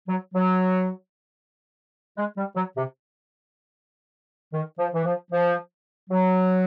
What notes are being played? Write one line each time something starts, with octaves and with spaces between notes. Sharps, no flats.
F#3
F#3
G#3
G3
F#3
C3
D#3
F3
E3
F3
F3
F#3